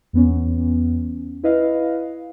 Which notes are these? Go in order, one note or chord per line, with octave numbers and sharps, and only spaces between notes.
E2 B3 C#4
E4 B4 D#5 F5